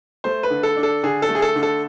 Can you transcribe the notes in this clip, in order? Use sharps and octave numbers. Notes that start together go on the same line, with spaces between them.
A3 C5
B4
D3
A4
D4
A4
D3 G#4
A4
A3
G#4
A4
D3
A4